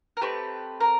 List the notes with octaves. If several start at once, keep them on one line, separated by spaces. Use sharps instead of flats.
A#4
A3 C4 G4 B4
A#4